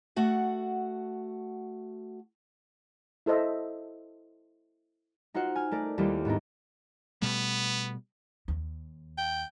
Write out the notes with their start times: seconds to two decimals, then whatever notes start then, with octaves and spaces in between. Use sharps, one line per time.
0.16 A3 F#4 F#5
3.26 E4 A4 C5 D#5 E5
5.34 D#4 F4 F#4 C5 F#5
5.56 G#5 F6
5.71 A3 A#4 D5
5.98 D#2 G3 E4 F4 G4
6.25 G#2 B3 D4 D#4
7.22 B2 G3 A3 B3
8.48 D#2
9.18 G5